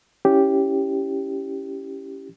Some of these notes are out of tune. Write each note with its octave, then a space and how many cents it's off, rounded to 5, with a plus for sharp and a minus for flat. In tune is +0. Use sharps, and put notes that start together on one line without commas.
C#4 +5 E4 +0 G4 +0